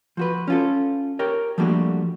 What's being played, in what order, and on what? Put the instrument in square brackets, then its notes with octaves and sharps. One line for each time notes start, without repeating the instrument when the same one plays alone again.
[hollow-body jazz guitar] F3 F#4 B4
C#4 F4 A4
G4 A#4 C#5 G5
F3 G3 A3 A#3 D4 F#4